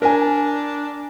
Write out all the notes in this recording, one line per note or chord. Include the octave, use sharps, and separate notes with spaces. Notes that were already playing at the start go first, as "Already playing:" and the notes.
D4 A#4 G#5